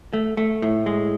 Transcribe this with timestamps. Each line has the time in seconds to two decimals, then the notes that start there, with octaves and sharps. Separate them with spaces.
0.13 A3
0.37 A3
0.62 A2
0.86 G#3